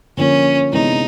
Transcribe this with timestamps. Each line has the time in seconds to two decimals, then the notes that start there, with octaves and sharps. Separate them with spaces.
0.17 D3 F3 A#3 C#4
0.73 C3 E3 G#3 B3 D4 D#4